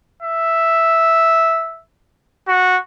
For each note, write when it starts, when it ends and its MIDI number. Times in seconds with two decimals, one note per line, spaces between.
0.23 1.81 76
2.48 2.78 66